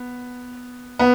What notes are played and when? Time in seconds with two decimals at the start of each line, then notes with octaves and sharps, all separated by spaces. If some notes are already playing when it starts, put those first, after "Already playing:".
Already playing: B3
0.99 B3